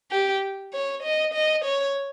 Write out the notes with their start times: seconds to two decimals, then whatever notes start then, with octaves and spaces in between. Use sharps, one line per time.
0.11 G4
0.73 C#5
1.03 D#5
1.34 D#5
1.65 C#5